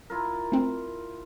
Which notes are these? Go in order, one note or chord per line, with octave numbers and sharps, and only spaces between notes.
E4 F4 A#4
A3 C4